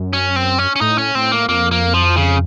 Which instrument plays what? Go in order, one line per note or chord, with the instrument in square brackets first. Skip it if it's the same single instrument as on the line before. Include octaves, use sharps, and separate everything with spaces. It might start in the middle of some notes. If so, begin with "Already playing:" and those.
Already playing: [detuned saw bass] F#2
[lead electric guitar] C#4
C4
C#4
C#4
[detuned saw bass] A2 [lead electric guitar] D#4
[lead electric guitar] C#4
[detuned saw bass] A2 [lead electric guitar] C4
[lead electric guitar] A#3
[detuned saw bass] F2 [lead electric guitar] A#3
[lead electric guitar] A#3
F3
C#3